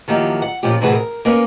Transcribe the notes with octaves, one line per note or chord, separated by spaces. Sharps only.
D#3 F3 F#3 A#3 E4 G4
F#5
A#2 F3 C#4 F4 G4
A2 C3 E3 F#4 G#4 B4
A#4
A#3 C#4 A#4 B4